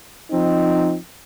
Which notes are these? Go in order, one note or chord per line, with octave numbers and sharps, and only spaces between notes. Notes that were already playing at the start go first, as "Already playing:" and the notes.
F3 C4 D#4